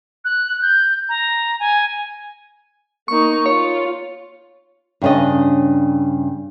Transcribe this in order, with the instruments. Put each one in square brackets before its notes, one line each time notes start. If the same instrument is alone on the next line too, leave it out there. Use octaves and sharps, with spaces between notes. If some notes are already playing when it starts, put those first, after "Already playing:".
[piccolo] F#6
G6
A#5
G#5
[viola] A#3 D#4 [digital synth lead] C#6
[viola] F4 [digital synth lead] C#5
[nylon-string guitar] G2 C#3 C#4 D4 D#5